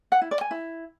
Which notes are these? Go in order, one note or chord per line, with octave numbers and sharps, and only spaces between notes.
F#5
E4
D5
G#5
E4